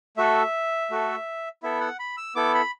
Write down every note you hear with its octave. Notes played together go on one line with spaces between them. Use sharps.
A3 F#4 A4 E5
A3 F#4 A4
B3 E4 A4 E5
F#5
B5
E6
B3 E4 A4 D6
B5